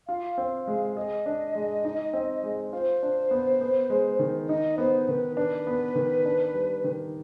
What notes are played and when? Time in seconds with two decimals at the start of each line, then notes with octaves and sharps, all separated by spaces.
0.08 F4 F5
0.38 C4
0.67 G#3
0.96 G#4 D#5
1.26 D4
1.55 G#3
1.85 D#4
2.13 C4
2.43 G#3
2.73 F4 C5
3.03 D4
3.31 B3
3.61 B3
3.90 G#3
4.19 D#3
4.49 D#4 D#5
4.78 B3 C5
5.08 D#3 B4
5.37 D4 B4
5.67 B3
5.96 D#3
6.26 D4
6.54 G3
6.84 D#3